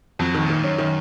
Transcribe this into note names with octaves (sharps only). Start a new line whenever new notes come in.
F2 F#3
D#3
A#2
D#3
G#2
F#2 C#4
D#3